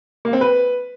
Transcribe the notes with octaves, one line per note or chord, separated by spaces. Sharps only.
A#3
C4
B4